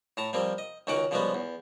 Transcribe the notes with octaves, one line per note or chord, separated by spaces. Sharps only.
A2 A5 A#5
F3 G3 A#3 C4
D#5
C#2 D#3 C#4 F#4 F#5 D6
C#3 F3 G3 G#3 B3 F#4
E2